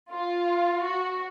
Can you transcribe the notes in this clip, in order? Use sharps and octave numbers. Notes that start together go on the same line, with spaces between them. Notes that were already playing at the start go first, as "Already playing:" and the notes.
F4
F#4